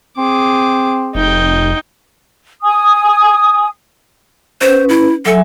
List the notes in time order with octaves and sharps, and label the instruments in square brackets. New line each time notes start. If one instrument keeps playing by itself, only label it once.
[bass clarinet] C4 [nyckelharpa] G#4 D6
[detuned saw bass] F1 [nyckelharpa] D#4 G5
[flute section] G#5 D#6
[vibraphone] C#4 B4 [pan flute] C5
[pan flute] E4
[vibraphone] F#3 E5 G#5 [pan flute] A4